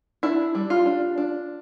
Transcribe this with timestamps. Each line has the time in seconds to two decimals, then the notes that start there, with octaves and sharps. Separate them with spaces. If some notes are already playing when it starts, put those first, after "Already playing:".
0.23 D4 E4
0.55 G3
0.70 F4
0.86 D4
1.18 D4